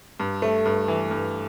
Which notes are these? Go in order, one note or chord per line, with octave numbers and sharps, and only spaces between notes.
G2
A3
G2
E3
G2